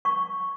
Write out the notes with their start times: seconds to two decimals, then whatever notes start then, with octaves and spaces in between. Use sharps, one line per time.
0.05 C#6